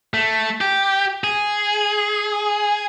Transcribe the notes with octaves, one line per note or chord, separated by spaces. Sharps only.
A3
G4
G#4